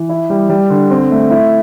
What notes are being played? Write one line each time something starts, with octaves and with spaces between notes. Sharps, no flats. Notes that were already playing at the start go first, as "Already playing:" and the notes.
Already playing: E3
E4
G3
G3
D3
C4
A3
E4